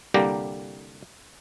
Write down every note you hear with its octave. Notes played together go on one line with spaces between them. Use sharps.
C2 D3 G3 A#3 G4 A#5